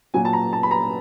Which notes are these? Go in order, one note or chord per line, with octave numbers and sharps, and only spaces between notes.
A#2 F#3 G#5
A5
A#5
A5
B5
A#5